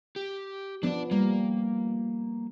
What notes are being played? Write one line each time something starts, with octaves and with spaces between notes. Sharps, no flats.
G4
F3 B3 D4 D5
G3 A#3